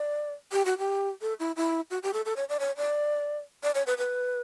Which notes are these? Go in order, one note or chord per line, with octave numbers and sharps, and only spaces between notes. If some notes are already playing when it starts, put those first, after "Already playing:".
Already playing: D5
G4
F#4
G4
A4
E4
E4
F#4
G4
A4
A4
C#5
D5
C#5
D5
D5
C#5
B4
B4